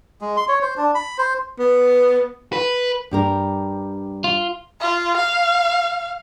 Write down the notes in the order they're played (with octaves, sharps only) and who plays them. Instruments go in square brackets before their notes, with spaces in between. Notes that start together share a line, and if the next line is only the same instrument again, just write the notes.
[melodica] G#3
C6
C#5
C5
D4
B5
C5
[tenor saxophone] B3
[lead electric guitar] B4
[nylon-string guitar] G2 G4 A#4
[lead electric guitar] F4
[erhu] F4
F5